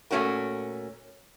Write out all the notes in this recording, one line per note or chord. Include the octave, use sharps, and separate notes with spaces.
A#2 A3 B3 C#4 F#4 A#4